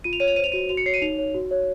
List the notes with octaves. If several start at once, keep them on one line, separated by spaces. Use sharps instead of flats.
F4 D#7
F7
C#5 D#7
F7
C5 D#7
F7
F#4 D#7
F#4 F7
C#7
C#5 C7
D#7
D#4 F7
C#5
F#4
C#5